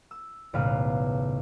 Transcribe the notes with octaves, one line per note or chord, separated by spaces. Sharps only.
E6
E1 B1 A2 C#3 B4 F5